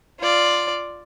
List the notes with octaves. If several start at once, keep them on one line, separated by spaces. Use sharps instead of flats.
F4 D5